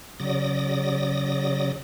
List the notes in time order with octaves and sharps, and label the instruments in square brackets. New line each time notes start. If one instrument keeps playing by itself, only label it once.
[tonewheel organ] C#3 F#3 D5 D#6 A#6